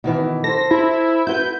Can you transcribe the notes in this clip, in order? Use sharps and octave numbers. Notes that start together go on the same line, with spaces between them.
B2 D#3 E3
A4 C5 A#6
E4
E4 F#4 B4 G6